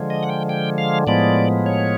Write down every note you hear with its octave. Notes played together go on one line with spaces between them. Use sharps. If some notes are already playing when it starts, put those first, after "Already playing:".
Already playing: D3 F3 G#3
D#5
F#5
G5
G5
F5
A2 F3 G#3 B3 D5
C#5